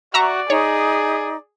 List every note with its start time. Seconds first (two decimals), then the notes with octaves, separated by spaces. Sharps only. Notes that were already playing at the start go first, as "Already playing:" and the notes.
0.14 F#4 D5 E5 A#5 C#6
0.50 D#4 G#4 C#5